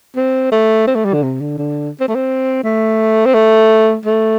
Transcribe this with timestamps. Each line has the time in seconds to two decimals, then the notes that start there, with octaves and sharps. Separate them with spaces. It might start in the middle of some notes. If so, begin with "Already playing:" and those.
0.16 C4
0.52 A3
0.87 C4
0.95 A3
1.05 G3
1.14 D3
1.23 C3
1.41 D3
1.58 D3
2.00 C4
2.08 A3
2.15 C4
2.64 A3
3.26 C4
3.34 A3
4.05 A3